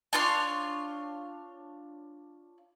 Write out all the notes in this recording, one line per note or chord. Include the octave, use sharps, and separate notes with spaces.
D4 F4 C#5 C6